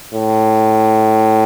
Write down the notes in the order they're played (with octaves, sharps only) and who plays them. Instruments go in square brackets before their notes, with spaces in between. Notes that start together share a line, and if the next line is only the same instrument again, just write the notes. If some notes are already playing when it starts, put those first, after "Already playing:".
[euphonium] A2